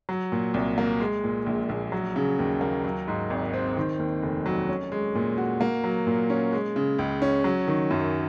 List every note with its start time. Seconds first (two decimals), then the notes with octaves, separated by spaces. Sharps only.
0.09 F#3
0.32 A#2
0.54 C2
0.78 A#3
1.00 G#3
1.24 A#2
1.46 A#1
1.69 A#1
1.92 F#3
2.16 C#3
2.39 D#2
2.61 A#3
2.85 F#3
3.08 G#2
3.30 G#1
3.53 C4
3.77 D#3
3.99 D#2
4.22 F1
4.46 F#3
4.68 C#4
4.92 G#3
5.15 A#2
5.38 F#4
5.61 A#3
5.84 F#3
6.07 A#2
6.30 C#4
6.52 G#3
6.76 C#3
6.99 C#2
7.22 C#4
7.44 F#3
7.67 D#3
7.91 F#2